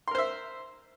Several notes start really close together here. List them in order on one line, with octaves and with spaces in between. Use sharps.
C6 A#4 C5 E5